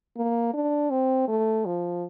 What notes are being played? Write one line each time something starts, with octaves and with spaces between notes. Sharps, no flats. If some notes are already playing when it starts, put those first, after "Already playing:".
A#3
D4
C4
A3
F3